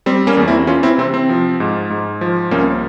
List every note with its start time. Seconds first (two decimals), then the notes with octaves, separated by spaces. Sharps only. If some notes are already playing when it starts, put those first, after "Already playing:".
0.06 G3 C4
0.27 A#3 C#4
0.37 E2
0.48 C4 E4
0.67 E3 C#4 F4
0.83 C4 E4
0.98 C3 C4
1.14 C4
1.29 F3
1.60 G#2
1.90 G#2
2.21 F3
2.51 C2 A#3 C#4